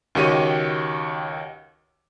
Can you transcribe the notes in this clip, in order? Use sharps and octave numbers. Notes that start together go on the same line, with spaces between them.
C#2 D#3 F#4 G4 C#5 D#7